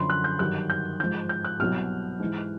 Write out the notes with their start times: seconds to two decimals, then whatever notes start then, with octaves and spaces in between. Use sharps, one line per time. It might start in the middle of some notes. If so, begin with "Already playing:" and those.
Already playing: F#2 D3 F3 B5 C6
0.10 F#6
0.24 G6
0.39 G2 D#3 F#3 F#6
0.70 G6
1.00 G#2 F3 G6
1.29 G6
1.45 F#6
1.60 C2 B2 F#3 F6
2.20 G#2 E3